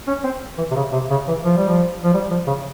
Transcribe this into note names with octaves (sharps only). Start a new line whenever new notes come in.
C#4
C4
E3
C3
C#3
C3
C#3
E3
F3
G3
F3
F3
G3
F3
C#3